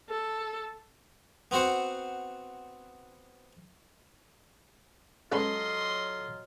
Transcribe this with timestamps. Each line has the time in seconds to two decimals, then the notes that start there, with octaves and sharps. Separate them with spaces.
0.10 A4
1.51 B3 C4 F#4 C5 F#5
5.32 F#3 G#3 B3 C#4 F4 A4 D#5 C6